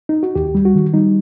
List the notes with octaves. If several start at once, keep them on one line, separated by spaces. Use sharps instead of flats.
D#4
F#4
D#2 G4
G3
F#4
D#3
G3 D#4